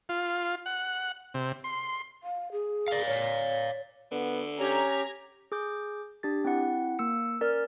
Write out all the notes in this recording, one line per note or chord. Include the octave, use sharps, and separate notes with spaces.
F4
F#5
C3
C6
F5
G#4
D5 F5
C#5
D3 B3
C#4 G4 A#5 G#6
G#4 D6 G6
D4 G4 A6
C4 E4 F#5
A#3 E6 C#7
C#4 A#4 D5 F6